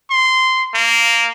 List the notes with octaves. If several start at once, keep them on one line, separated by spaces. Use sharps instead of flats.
C6
A#3